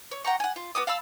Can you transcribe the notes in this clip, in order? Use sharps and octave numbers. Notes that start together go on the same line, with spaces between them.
C#5
F#5 G5 A#5 C#6
F#5 G#5
F4
B3 F#4 D6 D#6
F5 A5 B5 E6